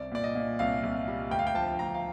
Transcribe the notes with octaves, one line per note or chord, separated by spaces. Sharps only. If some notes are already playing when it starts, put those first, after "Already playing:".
Already playing: C2 D5
A#2 D5
D#5
A#2
C2 F5
C2
G3
D2 G5
F5
G5
F3 A5
D2 A#5
F5